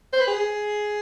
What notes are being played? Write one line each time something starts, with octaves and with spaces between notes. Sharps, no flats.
C5
B4
G#4